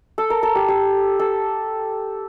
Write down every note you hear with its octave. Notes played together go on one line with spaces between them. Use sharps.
A4
A#4
A4
G4
G4
A4